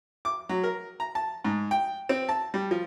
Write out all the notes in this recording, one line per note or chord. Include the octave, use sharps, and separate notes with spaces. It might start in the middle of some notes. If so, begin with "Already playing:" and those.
D6
F#3
A#4
A#5
A5
G#2
G5
C4
A5
G3
F3